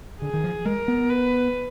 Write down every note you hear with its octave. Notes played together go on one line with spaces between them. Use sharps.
D3 G#4
D#3
F3
G#3 A#4
B3
B4